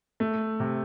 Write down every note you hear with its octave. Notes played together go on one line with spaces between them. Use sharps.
A3
C3